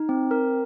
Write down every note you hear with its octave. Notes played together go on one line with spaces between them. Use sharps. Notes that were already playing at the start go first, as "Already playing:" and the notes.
Already playing: D#4
C4
A#4